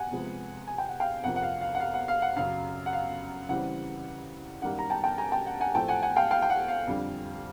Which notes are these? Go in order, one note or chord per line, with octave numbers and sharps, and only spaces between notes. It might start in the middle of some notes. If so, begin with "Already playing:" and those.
Already playing: F#5 G#5
C3 F3 G#3 B3
G#5
G5
F#5
F5 G5
F2 C3 F3 A#3 F#5
F#5
F5
F5
F#5
F5
F#5
F5
F#5
F#2 C#3 F#3 F5
F#5
F5
C#3 E3 G3 C4 F#5
F#2 D#3 G3 A#3 F#5
A#5
G5 A5
G5 A5
G#5 A#5
G5 A5
F#5
F#5 G#5
A2 F3 A3 C4 G5 A5
F#5 G#5
F#5 G#5
F5 G5
F5 G5
G5
F#5
F5
F2 D3 G3